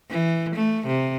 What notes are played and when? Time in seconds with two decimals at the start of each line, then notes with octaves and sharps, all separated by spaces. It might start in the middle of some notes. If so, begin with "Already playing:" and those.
0.11 E3
0.56 A3
0.87 C3